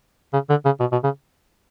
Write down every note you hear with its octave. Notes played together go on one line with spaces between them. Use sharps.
C#3
D3
C#3
B2
B2
C#3